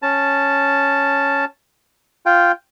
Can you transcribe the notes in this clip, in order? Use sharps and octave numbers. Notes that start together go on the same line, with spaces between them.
C#4 A5
F4 G5